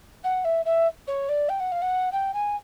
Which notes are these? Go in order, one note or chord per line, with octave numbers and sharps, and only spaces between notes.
F#5
E5
E5
C#5
D5
G5
F#5
F5
F#5
G5
G#5